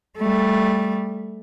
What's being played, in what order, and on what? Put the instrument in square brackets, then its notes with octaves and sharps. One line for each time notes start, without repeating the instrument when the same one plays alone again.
[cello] G3 A3